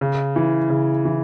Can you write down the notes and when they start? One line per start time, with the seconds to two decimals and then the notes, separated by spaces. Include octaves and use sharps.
0.01 C#3
0.36 E3
0.69 C#3
1.05 E3